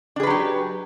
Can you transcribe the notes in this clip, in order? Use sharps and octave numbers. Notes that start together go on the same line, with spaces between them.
F#3 D4 G4 G#4 B4